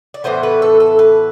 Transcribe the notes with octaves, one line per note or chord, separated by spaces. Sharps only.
D5
A2 E3 B3 C5
B4
A4
A4
B4